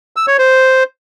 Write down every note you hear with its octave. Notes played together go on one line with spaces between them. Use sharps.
E6
C#5
C5